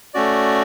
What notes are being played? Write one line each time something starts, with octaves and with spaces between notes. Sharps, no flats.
A3 C#4 F#4 D5